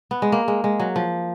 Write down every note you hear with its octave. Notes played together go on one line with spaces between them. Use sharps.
B3
G#3
A#3
G#3
G#3
F#3
F3